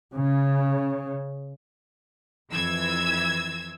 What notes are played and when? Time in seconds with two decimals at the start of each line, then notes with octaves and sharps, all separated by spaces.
0.14 C#3
2.51 F2 E3 E6 G#6